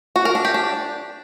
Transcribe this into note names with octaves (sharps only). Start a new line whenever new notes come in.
F#4
A#4
D4
G4
D4